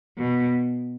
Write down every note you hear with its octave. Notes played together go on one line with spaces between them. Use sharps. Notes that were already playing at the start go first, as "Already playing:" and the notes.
B2